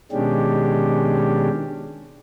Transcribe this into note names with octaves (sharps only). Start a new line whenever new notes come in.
B2 D#3 G#3 C#4 D4 G4